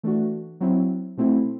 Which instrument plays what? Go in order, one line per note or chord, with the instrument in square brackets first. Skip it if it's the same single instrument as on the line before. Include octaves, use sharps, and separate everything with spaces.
[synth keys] E3 A3 D4 F#4
F#3 C4 E4
B2 A3 C4 E4